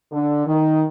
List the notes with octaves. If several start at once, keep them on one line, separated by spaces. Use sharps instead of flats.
D3
D#3